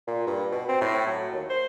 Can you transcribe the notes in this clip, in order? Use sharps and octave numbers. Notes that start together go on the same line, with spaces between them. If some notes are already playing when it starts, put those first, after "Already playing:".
A#2
G2
B2
C4
A2
F#3
D#2
C5